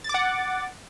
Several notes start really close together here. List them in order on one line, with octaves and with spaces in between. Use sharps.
A6 D6 F#5